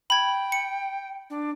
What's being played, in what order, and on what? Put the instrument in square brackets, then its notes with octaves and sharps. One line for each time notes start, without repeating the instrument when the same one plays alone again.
[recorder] G5 [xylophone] B5 G#6
[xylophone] C#7
[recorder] D4